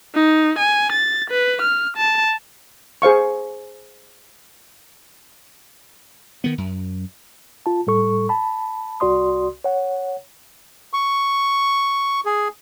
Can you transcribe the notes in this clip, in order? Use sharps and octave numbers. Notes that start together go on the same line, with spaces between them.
D#4
G#5
A6
B4
F6
A5
G#4 C5 F5 C#6
D#3 B3
F#2
F4 A5
A2 G3 A4 C#6
A5 B5
C2 F#4 D5 C6 D#6
C#5 F#5
C#6
G#4